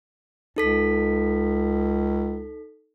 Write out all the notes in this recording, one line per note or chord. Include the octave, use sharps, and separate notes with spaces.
C#2 D#4 A4 B6